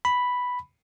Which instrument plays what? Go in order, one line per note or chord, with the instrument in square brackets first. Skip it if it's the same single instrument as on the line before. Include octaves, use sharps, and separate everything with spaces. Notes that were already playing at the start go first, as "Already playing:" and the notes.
[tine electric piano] B5